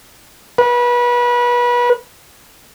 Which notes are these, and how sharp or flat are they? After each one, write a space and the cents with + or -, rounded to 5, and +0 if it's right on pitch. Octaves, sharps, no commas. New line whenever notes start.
B4 -30